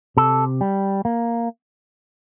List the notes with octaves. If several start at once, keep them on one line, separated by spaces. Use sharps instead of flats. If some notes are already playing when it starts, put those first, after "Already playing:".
C3 A4
G3
A#3